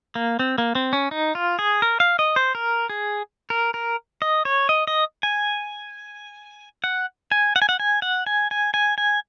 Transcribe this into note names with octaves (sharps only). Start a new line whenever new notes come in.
A#3
C4
A#3
C4
C#4
D#4
F4
G#4
A#4
F5
D#5
C5
A#4
G#4
A#4
A#4
D#5
C#5
D#5
D#5
G#5
F#5
G#5
F#5
G#5
F#5
G#5
F#5
G#5
G#5
G#5
G#5